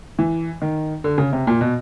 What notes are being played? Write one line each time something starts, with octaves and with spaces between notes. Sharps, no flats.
E3
D#3
D3
C#3
C3
A#2
B2